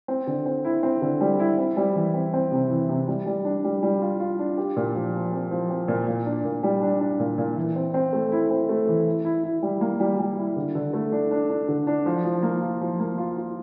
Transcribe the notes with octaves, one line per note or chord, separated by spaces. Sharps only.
C4
D3
C4
E4
C4
D3
G3
E4
C4
G3
E3
C4
C4
C3
E3
C3
G3
G3
D4
G3
G3
F4
F4
D4
G4
A#2
F3
F3
C4
F3
C4
A#2
A#2
D4
A#2
G3
D4
D4
A#2
A#2
E3
C4
C4
A3
E4
C4
A3
E3
E4
E4
E4
G3
A#3
G3
G3
E4
D3
D3
A3
D4
D4
D4
D3
D4
F3
F3
A#3
F4
F3
A#3
F4
F4